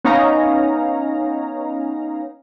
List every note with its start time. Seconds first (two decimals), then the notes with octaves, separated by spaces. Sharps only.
0.04 B3 C#4 D#4 C#5 F5 A#5